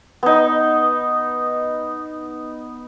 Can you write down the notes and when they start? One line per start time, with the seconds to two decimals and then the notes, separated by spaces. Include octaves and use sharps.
0.23 B3 D#4